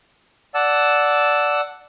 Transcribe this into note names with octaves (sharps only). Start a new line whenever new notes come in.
D5 F#5 A5 E6